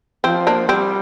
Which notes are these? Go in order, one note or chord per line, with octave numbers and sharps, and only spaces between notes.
F3 C4
A#3 D4
G3 C4